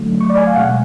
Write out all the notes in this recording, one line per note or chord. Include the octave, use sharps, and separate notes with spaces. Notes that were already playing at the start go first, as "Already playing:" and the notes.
Already playing: D3 F#3 A3
C#6
D5
G#5
F5
B2 G#3 F#5
F#5